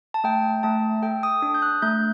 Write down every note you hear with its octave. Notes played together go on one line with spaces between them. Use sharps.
A5
A3 G5
A3 A5
A4 G5
D#6
D4 D#6
G6
F#6
A3 G6